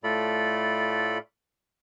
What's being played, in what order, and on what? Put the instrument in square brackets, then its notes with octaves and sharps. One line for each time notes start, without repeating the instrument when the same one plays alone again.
[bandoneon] A2 A3 F4 A4 D5 B5